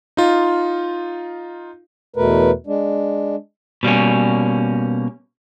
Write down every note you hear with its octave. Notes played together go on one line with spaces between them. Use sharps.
D#4 F4
E2 B2 A3 A#4 B4
G#3 D4
B2 G3 A#3 C#4